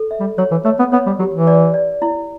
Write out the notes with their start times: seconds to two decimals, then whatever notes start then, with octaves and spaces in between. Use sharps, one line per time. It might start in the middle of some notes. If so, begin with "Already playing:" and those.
Already playing: A4
0.11 E5
0.20 G3
0.38 F#3 C#5
0.51 E3
0.65 A3 C#5
0.79 B3
0.92 B3 C#5
1.06 G3
1.19 F#3 G4
1.34 E3
1.47 D5
1.74 D5
2.02 E4